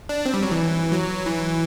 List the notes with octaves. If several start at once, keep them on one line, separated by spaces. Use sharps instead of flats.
D4
C4
G3
F#3
E3
F#3
E3